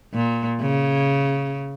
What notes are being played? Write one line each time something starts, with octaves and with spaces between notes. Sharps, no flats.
A#2
C#3